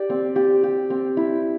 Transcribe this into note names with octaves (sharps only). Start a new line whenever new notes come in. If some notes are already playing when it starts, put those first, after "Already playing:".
Already playing: G4 D5
C4
G4
G4
C4
E4